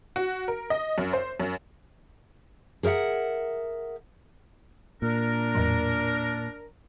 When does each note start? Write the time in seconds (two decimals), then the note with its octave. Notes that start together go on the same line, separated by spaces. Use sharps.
0.16 F#4
0.48 A#4
0.70 D#5
0.98 F#2
1.13 C5
1.40 F#2
2.83 G#4 A#4 C#5 E5 F#5
5.02 A#2 D4 A#4
5.55 E2 A2 F#3